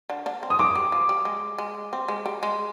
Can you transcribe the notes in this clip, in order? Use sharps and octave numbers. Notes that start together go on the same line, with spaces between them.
D3 D4
D3 D4
C4
D#6
G#3 D6
G3
F3
G3
G#3
G#3
C4
G#3
G3
G#3